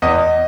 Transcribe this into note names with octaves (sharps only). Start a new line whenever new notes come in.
E2 D#5